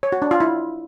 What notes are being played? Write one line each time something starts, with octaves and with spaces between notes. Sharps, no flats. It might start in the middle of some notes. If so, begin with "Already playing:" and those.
C#5
F#4
D4
F4
E4